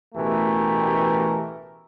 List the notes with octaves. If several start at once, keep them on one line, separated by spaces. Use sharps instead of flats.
A1 B2 E3 A3 G4 A#4